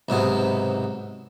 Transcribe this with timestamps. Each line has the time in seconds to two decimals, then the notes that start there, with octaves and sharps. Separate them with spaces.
0.09 B1 G#2 C3 B3